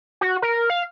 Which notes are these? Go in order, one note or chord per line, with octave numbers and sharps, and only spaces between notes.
F#4
A#4
F5